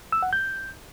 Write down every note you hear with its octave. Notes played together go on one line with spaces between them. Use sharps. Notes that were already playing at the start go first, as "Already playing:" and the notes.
E6
F#5
G6